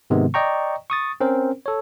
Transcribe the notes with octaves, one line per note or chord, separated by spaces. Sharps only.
G#2 C3 D#3 G#3 B3
D5 D#5 G5 A#5 C#6
C#6 D#6 A6
C4 C#4 A#4 C5
A4 C#5